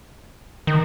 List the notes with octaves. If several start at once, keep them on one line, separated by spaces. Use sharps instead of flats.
D#3